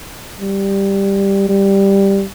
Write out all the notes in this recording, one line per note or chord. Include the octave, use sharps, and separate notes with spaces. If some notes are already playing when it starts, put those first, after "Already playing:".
G3
G3